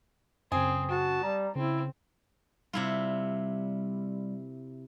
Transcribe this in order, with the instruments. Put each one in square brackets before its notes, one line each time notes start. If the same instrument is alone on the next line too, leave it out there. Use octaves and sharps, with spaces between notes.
[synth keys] F#2 C#3 [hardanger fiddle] C4 [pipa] G#4
[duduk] F#4 [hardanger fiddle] A5
[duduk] G3 [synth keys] A#5
[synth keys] C#3 [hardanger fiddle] C4 [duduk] E4
[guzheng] C3 E4 F4 [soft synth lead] G3